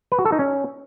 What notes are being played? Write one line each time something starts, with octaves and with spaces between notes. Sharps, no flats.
B4
F#4
A4
D#4
C#4